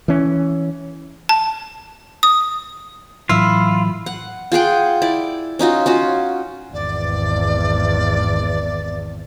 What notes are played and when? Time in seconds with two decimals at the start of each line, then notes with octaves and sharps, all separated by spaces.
0.08 E3 C#4
1.29 A5
2.23 D#6
3.29 A2 E3 F#3 E4 F4
4.06 F#5
4.52 F4 G#4 F#5 G5
5.02 E4 D5
5.59 C#4 D#4 F4 F#4
5.86 C#4 F4 F#4
6.73 G#1 E2 D5